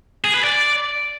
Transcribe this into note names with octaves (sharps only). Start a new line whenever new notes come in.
G#4
B4
D5